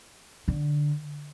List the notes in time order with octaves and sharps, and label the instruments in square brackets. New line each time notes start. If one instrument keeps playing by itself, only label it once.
[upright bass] D3